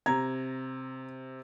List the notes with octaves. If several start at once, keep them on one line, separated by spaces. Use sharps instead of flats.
C3 A#5 G#6